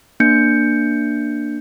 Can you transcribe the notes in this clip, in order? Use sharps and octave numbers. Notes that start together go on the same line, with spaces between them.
A#3 D4 G6 C#7